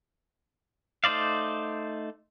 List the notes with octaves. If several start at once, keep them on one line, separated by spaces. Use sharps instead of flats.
A3 D#4 C5 D5 F5